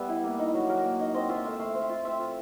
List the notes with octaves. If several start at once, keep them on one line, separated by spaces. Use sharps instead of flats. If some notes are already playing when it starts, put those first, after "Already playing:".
Already playing: G3 B3 E5
E4
A#3
D#4
F#3
F#3 A#4
A#3
D#4
C4 D#5
F4 E5
A3 E5
A3 F5
C4
E5
F4
C4 E5
F4